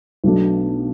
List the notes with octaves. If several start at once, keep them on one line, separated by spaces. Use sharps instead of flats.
B1 B2 A3 D4